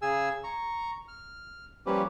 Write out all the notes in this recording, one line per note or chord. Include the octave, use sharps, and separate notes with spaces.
C#3 G#4 G#5 E6
A#5 C#6
F6
F3 G3 A#3 C#4 G4 B4